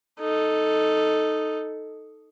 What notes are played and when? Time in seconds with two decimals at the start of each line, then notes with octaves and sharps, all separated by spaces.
0.20 D#4 A4